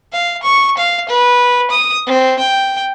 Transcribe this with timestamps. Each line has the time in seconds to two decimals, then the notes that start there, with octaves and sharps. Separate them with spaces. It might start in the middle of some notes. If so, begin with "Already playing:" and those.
0.13 F5
0.43 C#6
0.78 F5
1.09 B4
1.71 D#6
2.06 C4
2.39 G5